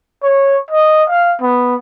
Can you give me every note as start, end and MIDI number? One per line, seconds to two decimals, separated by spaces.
0.23 0.56 73
0.71 1.04 75
1.10 1.34 77
1.41 1.76 59